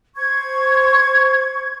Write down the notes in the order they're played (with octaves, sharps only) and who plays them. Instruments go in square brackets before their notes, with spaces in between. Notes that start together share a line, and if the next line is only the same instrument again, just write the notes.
[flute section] C5 C#6 G#6